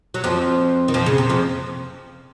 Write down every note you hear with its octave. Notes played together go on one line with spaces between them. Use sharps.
F#3
F2 F3
D#3
F2 F3
C#3
C3
F2 F3